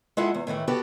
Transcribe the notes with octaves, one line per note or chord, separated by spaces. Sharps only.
G#3 E4 F4 G#4 A4 F#5
E2
A2 D#3 E3 A3
B3 F#4 G4 A4 B4